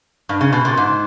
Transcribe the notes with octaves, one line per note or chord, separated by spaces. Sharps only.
G2
C#3
B2
A#2
G#2